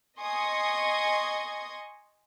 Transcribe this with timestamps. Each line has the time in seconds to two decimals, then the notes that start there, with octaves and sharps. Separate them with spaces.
0.19 D#5 G#5 C6 C#6 D#6